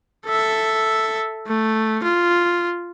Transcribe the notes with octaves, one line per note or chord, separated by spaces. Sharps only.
A4 E5
A3
F4